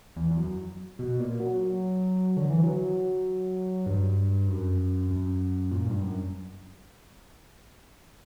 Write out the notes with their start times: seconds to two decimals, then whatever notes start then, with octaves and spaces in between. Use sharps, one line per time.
0.16 E2
0.31 E2
0.37 F#2
0.99 B2
1.19 A#2
1.40 F#3
2.37 D3
2.50 E3
2.63 F#3
3.86 G2
4.48 F#2
5.10 F#2
5.71 A#2
5.87 G2
6.02 F#2